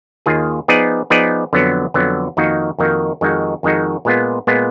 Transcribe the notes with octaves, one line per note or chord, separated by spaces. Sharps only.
D#2 D#3 A#3 F4 G#4
F3 B3 D#4 G#4 D5
F3 B3 D#4 G#4 D5
F2 D3 F#3 B3
F2 D3 F#3 B3
F2 D#3 A#3 D#4 F#4
F2 D#3 A#3 D#4 F#4
F2 D#3 G#3 D#4 F#4
F2 D#3 G#3 D#4 F#4
A#2 G#3 B3 F4
A#2 G#3 B3 F4